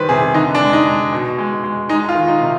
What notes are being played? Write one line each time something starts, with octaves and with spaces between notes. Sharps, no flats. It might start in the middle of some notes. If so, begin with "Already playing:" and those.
Already playing: D#3 G3 B4 C5
C3 G#4
D3 D#4
D4
G#3
D#4
G#3
B2
G#3
G#3
G#3 D#4
F4
D#3
D#4
C3